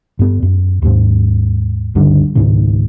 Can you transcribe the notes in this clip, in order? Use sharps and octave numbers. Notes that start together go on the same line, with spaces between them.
G2 B3
F#2
D#2 G#2
C#2 G2 D3 G3
C#2 G#2 B2 D#3